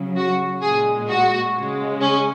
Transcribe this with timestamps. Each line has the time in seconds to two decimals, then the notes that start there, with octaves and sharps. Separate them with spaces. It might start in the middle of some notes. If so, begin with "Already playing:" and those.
Already playing: C#3 F#3
0.17 F#4
0.62 A#2 G#3 G#4
1.09 F#4
1.56 C#3 G#3
2.02 C#4